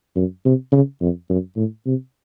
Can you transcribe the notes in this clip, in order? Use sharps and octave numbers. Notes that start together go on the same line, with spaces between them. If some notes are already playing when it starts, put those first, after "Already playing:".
F#2
C3
C#3
F2
F#2
A2
C3